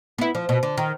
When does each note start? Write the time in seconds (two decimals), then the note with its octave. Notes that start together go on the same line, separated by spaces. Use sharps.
0.18 B3 E4
0.35 F3
0.49 B2
0.63 D3
0.77 D#3